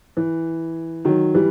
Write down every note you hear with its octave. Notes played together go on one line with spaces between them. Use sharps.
E3
D#3 F#3
E3 G3